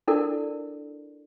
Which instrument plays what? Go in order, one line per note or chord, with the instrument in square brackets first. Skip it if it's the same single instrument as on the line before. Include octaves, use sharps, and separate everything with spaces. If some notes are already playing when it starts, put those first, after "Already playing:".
[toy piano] D4 E4 A4 A#4 D5